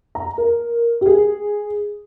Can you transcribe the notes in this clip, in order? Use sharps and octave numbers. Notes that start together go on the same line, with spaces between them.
A#5
A#4
G4
G#4